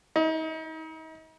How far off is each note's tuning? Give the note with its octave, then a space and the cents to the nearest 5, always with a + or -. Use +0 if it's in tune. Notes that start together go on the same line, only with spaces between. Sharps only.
D#4 +40